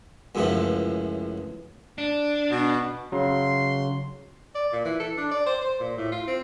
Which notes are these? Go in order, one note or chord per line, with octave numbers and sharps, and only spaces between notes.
C#2 F#2 A2 C#3 E3 F3
D4
B2
C#3 F#3 C6
D5
A#2
E3
A4
D4
D5
C5
C5
A#2
A2
F4
C4